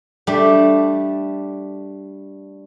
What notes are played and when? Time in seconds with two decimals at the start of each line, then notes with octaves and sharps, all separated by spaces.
0.27 G3 A3 D4